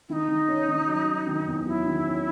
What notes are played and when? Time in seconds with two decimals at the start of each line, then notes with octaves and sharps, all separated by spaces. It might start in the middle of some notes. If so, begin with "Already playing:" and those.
0.09 D#3 D#4 E4
0.28 D#3
0.48 C#4
0.68 D#3
0.88 F#3
1.07 F#3
1.27 D#3
1.47 E2
1.66 F#3 E4
1.86 D#3
2.06 C#4